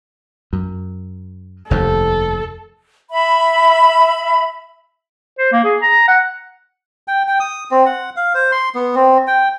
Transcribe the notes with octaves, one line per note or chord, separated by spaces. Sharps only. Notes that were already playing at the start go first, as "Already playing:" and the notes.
F#2
F1 D#2 A4
E5 B5
C5
A#3
G#4
A#5
F#5
G5
G5
D#6
C4
F#5
F5
C5
C6
B3
C4
G5